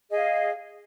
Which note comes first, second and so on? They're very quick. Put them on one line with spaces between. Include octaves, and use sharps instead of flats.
G#4 D#5 F5